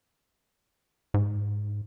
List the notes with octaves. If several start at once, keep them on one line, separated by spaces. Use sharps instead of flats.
G#2